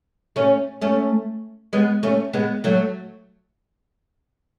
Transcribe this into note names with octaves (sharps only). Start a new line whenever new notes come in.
A3 C#4
A3 C#4
G#3 B3
A3 C#4
G#3 B3
F#3 A3